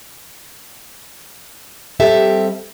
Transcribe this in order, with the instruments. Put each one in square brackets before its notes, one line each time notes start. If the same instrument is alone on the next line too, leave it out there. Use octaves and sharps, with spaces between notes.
[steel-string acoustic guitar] G3 C4 G4 A4 E5